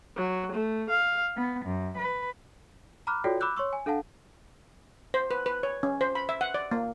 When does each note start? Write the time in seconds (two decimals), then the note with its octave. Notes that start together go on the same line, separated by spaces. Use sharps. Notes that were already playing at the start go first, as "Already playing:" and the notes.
0.16 F#3
0.51 A3
0.89 F5
1.36 B3
1.66 F#2
1.98 B4
3.07 A#5 B5 D6 F6 F#6
3.24 F4 F#4 A4 C#5 D5 G5
3.40 B5 D6 E6 F#6 G6
3.57 C#5 C6 C#6 E6
3.73 G#5
3.86 D4 A4 F5 F#5 A5
5.14 C5
5.31 B4
5.46 B4
5.63 C#5
5.83 C#4
6.01 C5
6.15 B5
6.29 E5
6.41 F#5
6.54 D5
6.71 A#3